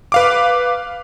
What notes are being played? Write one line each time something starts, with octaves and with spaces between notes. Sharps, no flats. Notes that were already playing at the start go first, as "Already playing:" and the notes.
B4 F5 D6